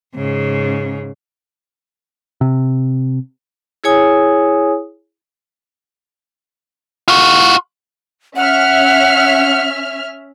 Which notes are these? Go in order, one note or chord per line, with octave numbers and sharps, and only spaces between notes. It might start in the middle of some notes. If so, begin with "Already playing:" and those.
G#2 C#3
C3
E4 G#4 C#5 G#5 D#6
F4 F#4
C#4 E5 F#5 F6